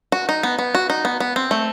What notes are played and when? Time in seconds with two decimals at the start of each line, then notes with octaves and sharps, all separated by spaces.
0.12 F#4
0.29 D#4
0.43 B3
0.58 B3
0.75 F#4
0.90 D#4
1.05 B3
1.20 B3
1.36 C4
1.51 A3